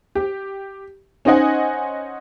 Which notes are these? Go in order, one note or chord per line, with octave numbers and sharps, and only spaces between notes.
G4
C#4 D#4 C5 D#5 F#5 G#5